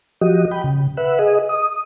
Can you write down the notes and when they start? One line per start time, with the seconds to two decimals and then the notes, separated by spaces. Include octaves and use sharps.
0.21 F3 F#4 G4 D#5
0.51 G5 B5
0.64 C#3
0.97 B4 E5 F#5
1.19 G#4 D#5
1.49 D#6